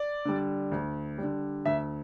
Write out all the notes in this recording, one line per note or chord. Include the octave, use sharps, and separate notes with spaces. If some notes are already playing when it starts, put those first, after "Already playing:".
Already playing: D5
D3 G3
D2
D3 G3
D2 E5